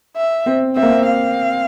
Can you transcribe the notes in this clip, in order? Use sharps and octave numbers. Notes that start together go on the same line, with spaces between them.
E5
C4
C4 E5
A#3
C4
F5